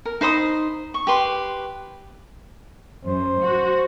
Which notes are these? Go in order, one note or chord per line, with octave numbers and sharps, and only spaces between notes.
A#4
D#4 C5 B5 D#6
C#6
G4 B4 C6
F#2 C5
F#4